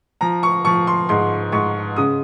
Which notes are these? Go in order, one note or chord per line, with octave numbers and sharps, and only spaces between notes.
F3 A#5
C#6
F3 C#6
C6
G#2 C6
G#2 C#6
C#3 D#6